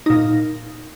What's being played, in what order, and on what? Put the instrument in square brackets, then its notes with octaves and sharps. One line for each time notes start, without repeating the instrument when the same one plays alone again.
[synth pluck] A#2 D#4